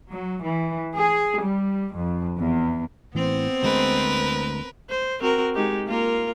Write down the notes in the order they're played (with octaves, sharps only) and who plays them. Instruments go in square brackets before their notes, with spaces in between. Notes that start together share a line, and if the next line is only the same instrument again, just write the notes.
[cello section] F#3
E3
G#4
G3
F2
E2
[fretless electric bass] A1 E3 [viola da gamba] B3 C4 C5
[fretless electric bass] D2 G#3 [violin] A#4 B4
[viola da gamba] C5
C4 F#4 A#4
G#3 D#4 G4
A#3 F4 A#4